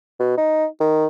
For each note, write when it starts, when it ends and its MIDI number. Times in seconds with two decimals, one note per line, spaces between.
0.20 0.34 47
0.38 0.65 63
0.81 1.07 51